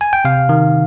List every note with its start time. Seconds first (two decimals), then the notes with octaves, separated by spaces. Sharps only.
0.01 G#5
0.13 G5
0.25 C3 F5
0.49 D#3